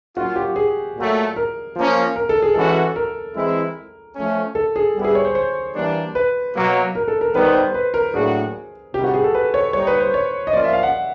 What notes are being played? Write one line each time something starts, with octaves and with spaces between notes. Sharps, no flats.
F#3 A#3 C#4 F4 F#4
G4
G#4
A#2 F#3 A3
A#4
F3 A#3 C#4
A#4
A4
G#4
E3 G#3 C#4 F#4 A4
A#4
E3 G#3 C4 E4
F3 A3 C#4
A4
G#4
G3 B3 E4
G#4
C#5
C5
C5
E3 G3 A#3 D4
B4
B2 F#3 A#3
A#4
A4
A#4
D#3 G3 B3 B4
C5
C5
B4
A#4
A2 F#3 A#3 D4 F#4 G#4
C3 D#3 G3 G4
F#4
G#4
A4
B4
C#5
G3 A#3 D#4 C#5
B4
C5
C#5
D#5
F3 A#3 C#4 F4 D5
E5
F5
F#5